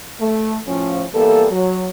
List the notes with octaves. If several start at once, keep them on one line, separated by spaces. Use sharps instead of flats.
A3
A2 F3 C#4
E3 G3 A#3 B3 A4
F#3